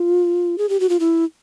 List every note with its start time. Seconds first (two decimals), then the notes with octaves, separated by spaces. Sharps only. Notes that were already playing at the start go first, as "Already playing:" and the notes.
Already playing: F4
0.58 G#4
0.69 G4
0.80 F#4
0.89 F4
1.00 E4